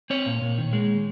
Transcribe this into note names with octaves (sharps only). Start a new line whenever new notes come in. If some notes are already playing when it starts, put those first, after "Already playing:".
C4 C#5
A#2
A#2
D#3
G#3